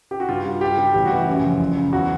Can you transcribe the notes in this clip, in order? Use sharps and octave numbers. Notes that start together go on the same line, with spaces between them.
G4
F#4
G2 F4
G3
G2 G4
G3
A1 G4
F#4
E3
F#2
F3
F#1
C#3
E2 F#4